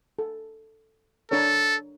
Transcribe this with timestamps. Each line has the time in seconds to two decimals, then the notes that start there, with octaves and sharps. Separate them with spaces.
0.19 A4
1.31 D4 A4 A#4 C#5